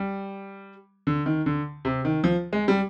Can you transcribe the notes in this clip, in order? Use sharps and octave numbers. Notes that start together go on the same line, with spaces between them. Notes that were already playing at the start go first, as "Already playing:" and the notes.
Already playing: G3
D3
D#3
D3
C3
D#3
F3
G#3
G3